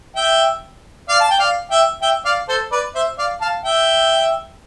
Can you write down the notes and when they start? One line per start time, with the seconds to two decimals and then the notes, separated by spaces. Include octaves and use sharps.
0.16 E5 G5
1.09 D5 F5
1.21 A5
1.30 G5
1.40 D5 F5
1.70 E5 G5
2.02 E5 G5
2.25 D5 F5
2.48 A4 C5
2.72 B4 D5
2.95 C5 E5
3.18 D5 F5
3.41 F5 A5
3.64 E5 G5